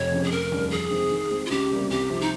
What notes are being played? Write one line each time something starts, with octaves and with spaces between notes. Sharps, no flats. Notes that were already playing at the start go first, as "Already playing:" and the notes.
Already playing: F1 C#5
F2 C#3
G#4
F1 A#4
D#2 C#3 G3
F2 G#4
C3 D#3 G#3 C4
D#3
G#3 C4
F4
C#2 G4
C3 G3 A#3
C2 G4
C3 F3
D#4